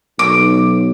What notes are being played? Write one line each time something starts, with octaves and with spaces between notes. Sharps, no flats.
B1 D6